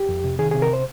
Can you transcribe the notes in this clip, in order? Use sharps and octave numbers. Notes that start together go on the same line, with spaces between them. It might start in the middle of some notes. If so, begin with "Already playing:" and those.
Already playing: G4
F2
C3
D#3 G#4
C3 G#4
A#4
C5